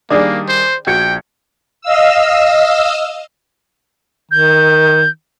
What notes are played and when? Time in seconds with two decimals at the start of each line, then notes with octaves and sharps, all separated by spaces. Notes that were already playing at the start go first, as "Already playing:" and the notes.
0.10 D#3 G3 A#3 D4 G#4 D5
0.48 C5
0.87 A#1 F#4 G5 G#6 C#7
1.81 D#5 F5 E6
4.31 D#3 G6